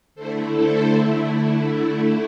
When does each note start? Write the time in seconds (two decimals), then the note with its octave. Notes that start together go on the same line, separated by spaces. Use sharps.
0.15 D3 A3 E4 A4 C5
0.55 A4 C5